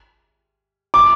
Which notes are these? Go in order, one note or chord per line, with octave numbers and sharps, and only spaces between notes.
D6